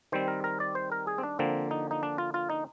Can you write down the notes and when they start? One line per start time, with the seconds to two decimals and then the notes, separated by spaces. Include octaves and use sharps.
0.12 D#3 G3 C4 C5
0.28 A#4
0.44 A#4
0.60 D5
0.75 C5
0.92 A#4
1.07 G#4
1.18 C4
1.23 D4
1.39 D3 F3 A#3 C4
1.71 D#4
1.91 D#4
2.03 D4
2.18 F4
2.34 F4
2.50 D#4